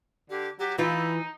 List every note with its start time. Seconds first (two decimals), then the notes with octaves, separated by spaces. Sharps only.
0.30 D3 G4
0.59 F#3 G4
0.78 E3 D#4 F4 B5